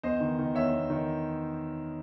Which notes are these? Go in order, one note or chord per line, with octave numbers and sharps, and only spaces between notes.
E2 C5 D#5
D#3
D#3
E2 C#5 E5
E2
D#3